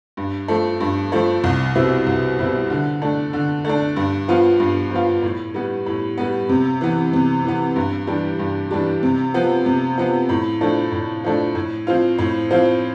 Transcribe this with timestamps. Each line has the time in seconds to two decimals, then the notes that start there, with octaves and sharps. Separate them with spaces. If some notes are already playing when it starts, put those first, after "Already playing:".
0.17 G2
0.48 F3 A3
0.80 G2
1.12 F3 A3
1.44 C2
1.75 B2 G3 C4 E4
2.07 C2
2.39 B2 G3 C4 E4
2.70 D3
3.02 A3 D4
3.33 D3
3.65 A3 D4
3.96 G2
4.28 F3 B3 F4
4.60 G2
4.91 F3 B3 F4
5.22 A2
5.54 G3 B3
5.86 A2
6.18 G3 B3
6.49 C3
6.81 E3 B3
7.13 C3
7.44 E3 B3
7.76 G2
8.07 E3 G3 D4 G4
8.39 G2
8.71 E3 G3 D4 G4
9.03 C3
9.34 F3 B3
9.66 C3
9.98 F3 B3
10.29 A2
10.61 F3 A3 D4
10.92 A2
11.24 F3 A3 D4
11.55 A2
11.87 F3 C4 F4
12.19 A2
12.51 F3 C4 F4